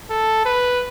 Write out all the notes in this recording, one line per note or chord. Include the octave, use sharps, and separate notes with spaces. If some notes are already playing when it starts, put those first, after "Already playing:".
A4
B4